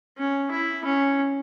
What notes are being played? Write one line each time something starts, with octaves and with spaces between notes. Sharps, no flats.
C#4
E4
C#4